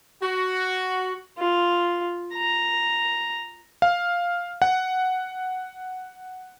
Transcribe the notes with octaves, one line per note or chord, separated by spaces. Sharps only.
F#4
F4
A#5
F5
F#5